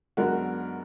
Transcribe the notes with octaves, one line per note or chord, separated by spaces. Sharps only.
F#2 D3 G#3 B3 F#4 A#4